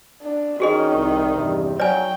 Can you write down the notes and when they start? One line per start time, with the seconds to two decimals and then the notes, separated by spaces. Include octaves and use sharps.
0.22 D4
0.60 D#3 C#4 F#4 G#4 D#5
0.94 C2
1.34 E2 G2 C3
1.80 F#3 D5 G5 G#5